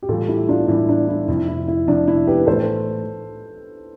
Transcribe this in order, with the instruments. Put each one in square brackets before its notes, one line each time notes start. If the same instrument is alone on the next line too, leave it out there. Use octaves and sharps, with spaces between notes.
[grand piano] G4
[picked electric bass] A2 E3 G3 [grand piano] F4 A4
[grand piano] E4 G4
D4 F4
[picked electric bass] A2 E3 G3 [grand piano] E4
[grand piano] D4
E4
[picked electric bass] F2 C3 F3 C4 [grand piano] E4
[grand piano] E4
E4
[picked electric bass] F2 C3 F3 C4 [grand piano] D4
[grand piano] E4
G4 B4
[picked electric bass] A2 E3 A3 [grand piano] A4 C5